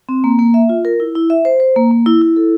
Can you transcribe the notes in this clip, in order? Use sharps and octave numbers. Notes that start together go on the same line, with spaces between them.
C4
A#3
A#3
E5
F4
A#4
E4
E4
E5
C5
C5
A#3
A#3
E4
E4
A4